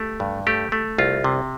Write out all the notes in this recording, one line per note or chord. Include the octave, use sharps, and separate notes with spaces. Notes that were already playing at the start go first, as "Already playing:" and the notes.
Already playing: A3 G4
G2
A3 G4
A3
C2 F4
C3